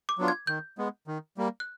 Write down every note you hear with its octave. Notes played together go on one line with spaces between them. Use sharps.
D6
F#3 B3 D4 F4
G#6
D#3 G6
G#3 B3
D#3
G3 A#3
F#6